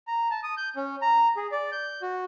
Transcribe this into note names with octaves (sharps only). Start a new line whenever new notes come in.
A#5
A5
D#6
G6
C#4
A#5
G#4
D5
G6
F#4